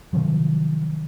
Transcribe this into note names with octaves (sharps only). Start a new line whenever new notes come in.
C3 D#3 F3 F#3